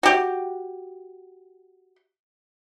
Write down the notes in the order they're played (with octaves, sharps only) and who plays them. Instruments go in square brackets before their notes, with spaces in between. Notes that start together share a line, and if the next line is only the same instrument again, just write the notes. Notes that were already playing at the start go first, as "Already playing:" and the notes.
[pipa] F#4 G4